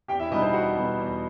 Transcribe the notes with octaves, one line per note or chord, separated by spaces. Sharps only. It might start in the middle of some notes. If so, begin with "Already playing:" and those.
E2 G4 G5
E4 E5
B2 G3 B3 D#4 D#5
C5
E2 F#4 F#5
B2 G3 B3
E2